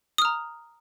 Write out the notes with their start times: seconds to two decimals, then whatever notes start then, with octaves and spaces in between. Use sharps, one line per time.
0.18 D#6
0.22 F6
0.25 A#5